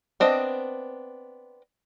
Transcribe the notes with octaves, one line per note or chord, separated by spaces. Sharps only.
B3 C4 D4 D#5